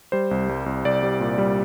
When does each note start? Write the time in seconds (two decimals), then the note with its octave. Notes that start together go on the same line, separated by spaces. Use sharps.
0.12 G3 C5
0.31 C2
0.49 C2
0.66 C2
0.85 C2 D5
1.03 G3
1.20 A#2
1.38 G3